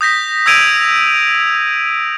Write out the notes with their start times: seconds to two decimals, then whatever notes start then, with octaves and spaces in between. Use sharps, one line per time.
0.01 D#6 G6 A#6 B6
0.46 D#6 E6 G#6 D7 D#7 F7